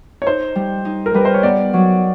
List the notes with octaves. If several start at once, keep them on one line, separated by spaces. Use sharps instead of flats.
C#5
D#4 C5
G3
D#4
A#4
G3 B4
C5
C#5
B3 D5
F#3